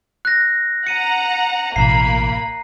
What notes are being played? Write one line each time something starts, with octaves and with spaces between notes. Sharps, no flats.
F#6 A#6
F#5 A#5 C#7 D#7
A1 B2 A#3 A#5 B5 C7